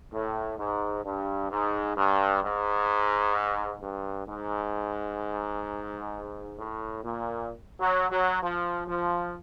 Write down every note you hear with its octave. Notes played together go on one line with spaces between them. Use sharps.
A2
G#2
G2
G#2
G2
G#2
G2
G#2
A2
A#2
F#3
F#3
F3
F3